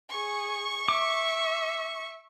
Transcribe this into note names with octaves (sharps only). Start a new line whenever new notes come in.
G#4 C#6
E5 D6